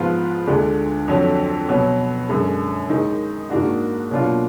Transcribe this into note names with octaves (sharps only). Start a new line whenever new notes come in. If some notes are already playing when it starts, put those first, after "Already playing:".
Already playing: G#2 F3 B3 F4
D2 D3 G#3 D4
F2 D3 F#3
B2 F#3 B3
F#2 D3 G#3
D#3 G#3 D#4
G#2 D#3 A#3 D4 F#4
B2 F#3 A#3 D4 F4